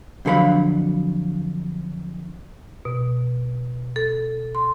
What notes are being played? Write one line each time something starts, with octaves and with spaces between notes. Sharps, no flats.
F2 D3 F#3 A4 F5 B5
B2
A4
C6